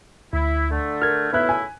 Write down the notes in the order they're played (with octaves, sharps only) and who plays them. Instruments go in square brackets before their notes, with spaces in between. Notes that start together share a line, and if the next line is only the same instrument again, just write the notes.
[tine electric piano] D2 [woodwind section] E4
[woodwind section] D3 A3
[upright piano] A#4 [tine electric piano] F6 G#6
[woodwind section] A2 C#3 E4 [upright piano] B3 E5 F#6
[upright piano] G#5